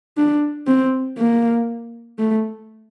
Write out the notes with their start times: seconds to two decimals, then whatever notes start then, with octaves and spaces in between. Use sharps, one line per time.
0.17 D4
0.67 C4
1.18 A#3
2.19 A3